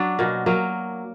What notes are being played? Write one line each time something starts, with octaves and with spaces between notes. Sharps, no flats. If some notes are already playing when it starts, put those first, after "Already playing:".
Already playing: F#3 D4
B2 A#3
F#3 A#3